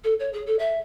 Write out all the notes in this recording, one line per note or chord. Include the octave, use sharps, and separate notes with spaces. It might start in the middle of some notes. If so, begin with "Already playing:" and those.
A4
C#5
G#4
A4
E5